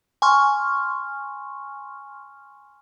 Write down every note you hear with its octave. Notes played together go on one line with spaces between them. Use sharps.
G#5 C6 C#6 F6